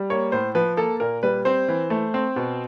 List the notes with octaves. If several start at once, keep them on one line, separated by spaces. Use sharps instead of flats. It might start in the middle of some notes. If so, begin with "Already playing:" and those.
Already playing: G3
A#3 C#5
A2 C5
F3 B4
A#3 A4
A#2 A#4
G3 B4
C4 C5
E3
A3
C4
B2